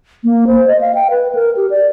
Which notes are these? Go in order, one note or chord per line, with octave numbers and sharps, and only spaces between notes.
A#3
C5
D#5
F5
G5
B4
A#4
G4
D5